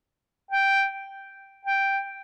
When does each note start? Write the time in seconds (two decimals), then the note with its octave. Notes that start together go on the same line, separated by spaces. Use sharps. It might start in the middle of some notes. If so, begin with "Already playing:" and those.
0.51 G5
1.65 G5